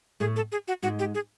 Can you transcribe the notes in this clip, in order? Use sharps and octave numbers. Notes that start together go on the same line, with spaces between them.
A2 A3 G#4
A4
G#4
F#4
G#2 G#3 F#4
G4
G#4